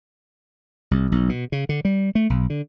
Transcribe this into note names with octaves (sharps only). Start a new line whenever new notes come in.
C2
B1
B2
C#3
D3
G3
A3
B1
D3